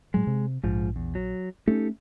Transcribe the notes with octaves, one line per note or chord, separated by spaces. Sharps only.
A2 F#3 G#3
C3
A#1 G#2 F3
E2
F#3
A3 A#3 C#4 D#4 G4 A4